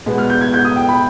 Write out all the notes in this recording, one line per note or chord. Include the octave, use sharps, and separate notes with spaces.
B2 G#3 B3
F6
G6
G#6
G6
D#6
G5
B5